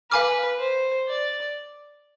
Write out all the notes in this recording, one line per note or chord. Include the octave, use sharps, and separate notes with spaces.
B4 F5 G#5 D6 F6
C5
D5